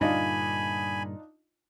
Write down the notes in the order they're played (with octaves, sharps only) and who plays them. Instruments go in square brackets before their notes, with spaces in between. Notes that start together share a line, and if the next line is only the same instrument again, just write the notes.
[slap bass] G2 A#2 D3 [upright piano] D4 D#4 F4 [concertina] G#5 B5